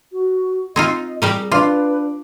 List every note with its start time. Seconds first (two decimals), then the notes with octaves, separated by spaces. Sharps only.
0.13 F#4
0.76 C4 D#4 F4 D#5
1.22 G3 G4 G#4 A#4
1.52 D4 F4 B4 F5 D6